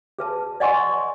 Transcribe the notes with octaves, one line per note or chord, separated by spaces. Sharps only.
G#4 B4 A5
D5 D#5 F#5 G#5 C6 C#6